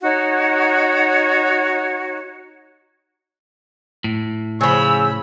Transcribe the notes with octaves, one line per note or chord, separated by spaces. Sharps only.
D#4 F#4 C#5 F#5
A2
C#3 F3 C#5 B5 E6